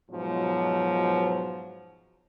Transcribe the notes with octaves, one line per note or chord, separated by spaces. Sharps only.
G#2 B2 F3 F#3